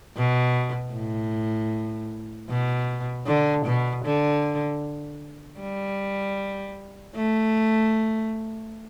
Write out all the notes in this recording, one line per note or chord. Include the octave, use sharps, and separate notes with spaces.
B2
A2
B2
D3
B2
D3
G3
A3